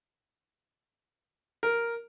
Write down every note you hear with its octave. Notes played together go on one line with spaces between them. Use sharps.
A#4